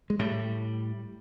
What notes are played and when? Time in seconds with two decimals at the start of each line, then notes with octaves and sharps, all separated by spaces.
0.10 G#3
0.19 A2 G3